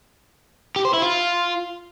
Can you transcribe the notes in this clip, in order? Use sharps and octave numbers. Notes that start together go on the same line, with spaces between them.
G4
C5
E4
F4